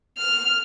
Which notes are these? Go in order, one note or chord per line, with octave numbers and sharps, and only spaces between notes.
F6